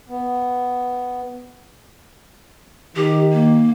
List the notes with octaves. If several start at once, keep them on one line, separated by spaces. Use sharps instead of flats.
B3
D#3 G4
A#3